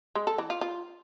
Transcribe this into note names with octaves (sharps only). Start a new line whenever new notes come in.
G#3
A4
E3
F4
F4